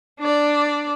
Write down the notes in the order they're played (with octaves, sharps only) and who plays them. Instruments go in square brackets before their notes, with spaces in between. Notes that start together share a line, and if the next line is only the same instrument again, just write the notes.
[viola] D4 D5